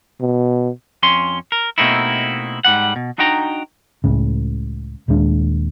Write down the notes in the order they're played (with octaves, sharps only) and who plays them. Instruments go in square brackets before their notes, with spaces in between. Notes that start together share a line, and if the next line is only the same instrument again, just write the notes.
[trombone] B2
[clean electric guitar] F2 C#4 C6
A#4
B2 A3 A#3 C4 D#4 E4
G#2 G3 F#5
B2
D4 D#4 F#4 G5 A#5
[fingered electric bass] C#2 A2 C#3
D#1 D#2 G#3 D4